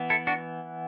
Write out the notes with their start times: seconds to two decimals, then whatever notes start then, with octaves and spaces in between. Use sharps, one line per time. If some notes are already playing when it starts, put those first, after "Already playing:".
Already playing: E3 B3
0.10 E4 A4
0.27 D4 F#4